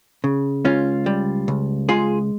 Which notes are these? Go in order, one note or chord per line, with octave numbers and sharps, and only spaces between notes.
C#3
C#2 C#4 F4
G3
C#2
G#3 F4 G#4